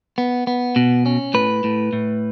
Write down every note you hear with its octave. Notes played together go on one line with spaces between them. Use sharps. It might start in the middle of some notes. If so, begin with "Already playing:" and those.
B3
B3
B2
C#4
A2 B4
A2
A2